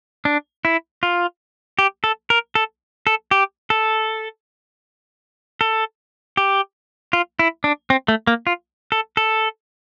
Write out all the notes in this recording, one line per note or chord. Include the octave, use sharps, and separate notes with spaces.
D4
E4
F4
G4
A4
A#4
A4
A4
G4
A4
A4
G4
F4
E4
D4
C4
A3
A#3
F4
A4
A4